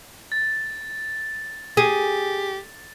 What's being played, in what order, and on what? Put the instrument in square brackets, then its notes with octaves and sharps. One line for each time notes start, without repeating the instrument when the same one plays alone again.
[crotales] A6
[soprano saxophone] G4 [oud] G#4